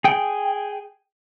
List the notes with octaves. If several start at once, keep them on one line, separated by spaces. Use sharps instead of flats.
G#4 G5